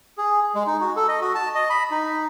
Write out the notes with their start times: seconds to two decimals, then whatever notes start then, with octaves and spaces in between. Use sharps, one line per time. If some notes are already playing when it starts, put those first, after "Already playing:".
0.18 G#4
0.55 G#3
0.67 D#4
0.81 F#4
0.96 A4
1.08 D#5
1.21 F#4
1.35 A5
1.55 D#5
1.70 B5
1.91 D#4